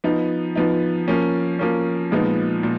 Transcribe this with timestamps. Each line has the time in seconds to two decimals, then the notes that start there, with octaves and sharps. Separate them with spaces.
0.04 F3 B3 D#4
0.55 F3 B3 D#4
1.08 F3 A#3 C#4
1.59 F3 A#3 C#4
2.11 A#2 F3 G#3 B3 D#4
2.63 A#2